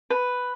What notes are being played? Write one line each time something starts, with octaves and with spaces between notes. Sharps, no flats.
B4